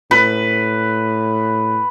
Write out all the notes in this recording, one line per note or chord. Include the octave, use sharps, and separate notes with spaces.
A2 B4